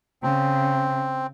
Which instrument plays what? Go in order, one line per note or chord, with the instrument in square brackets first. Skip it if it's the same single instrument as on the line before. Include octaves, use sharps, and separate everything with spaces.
[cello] C#3 [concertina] C4